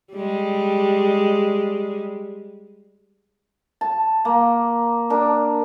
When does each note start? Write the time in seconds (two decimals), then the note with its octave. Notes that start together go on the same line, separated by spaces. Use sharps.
0.13 G3 G#3
3.81 A5
4.25 A#3
5.10 D4 A#4